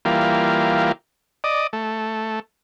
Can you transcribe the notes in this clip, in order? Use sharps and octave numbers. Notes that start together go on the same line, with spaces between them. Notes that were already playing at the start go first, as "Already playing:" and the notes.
E3 G3 A#3 F4
D5 D#5
A3